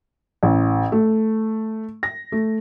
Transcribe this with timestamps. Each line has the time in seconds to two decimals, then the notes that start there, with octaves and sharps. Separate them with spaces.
0.43 A1
0.92 A3
2.03 A#6
2.32 A3